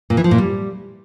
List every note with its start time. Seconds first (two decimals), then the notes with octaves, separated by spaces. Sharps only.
0.10 A#2
0.17 E3
0.24 F3
0.31 A#2
0.38 G3